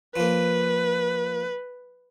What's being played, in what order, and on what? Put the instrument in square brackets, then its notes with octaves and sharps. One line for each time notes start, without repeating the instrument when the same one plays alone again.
[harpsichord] F3 A#3 [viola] B4